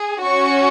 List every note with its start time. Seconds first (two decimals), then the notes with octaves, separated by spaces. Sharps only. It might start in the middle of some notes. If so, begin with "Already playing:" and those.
Already playing: G#4
0.24 C#4 F#4 C#6